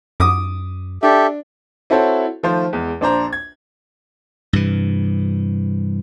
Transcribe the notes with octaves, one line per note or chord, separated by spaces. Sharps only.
F#2 D6 D#6
D4 G4 A4 E5
C4 E4 F#4 A4 C5 C#5
D#3 F3 A3 F4 C5
E2 G#3
A#1 D4 C5 A#5
G#6
G2 C3 E3